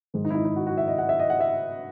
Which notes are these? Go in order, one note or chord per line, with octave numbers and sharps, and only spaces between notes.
G#2 D#3 G#3
D#4
E4
D#4
E4
F#4
F#4
E5
D#5
F#5
E5
D#5
F#5
E5